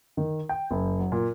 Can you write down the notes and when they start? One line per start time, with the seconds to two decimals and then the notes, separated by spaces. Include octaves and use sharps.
0.17 D#3
0.49 G5
0.71 F#1
0.99 F#3
1.12 A#2